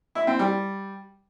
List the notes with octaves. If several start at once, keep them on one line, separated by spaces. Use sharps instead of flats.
E4
C4
G3